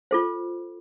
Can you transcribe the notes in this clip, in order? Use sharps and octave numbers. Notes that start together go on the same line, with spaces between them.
F4 A4 C5